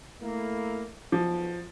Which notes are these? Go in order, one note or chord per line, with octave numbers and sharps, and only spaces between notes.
A3 A#3 E4
B1 F3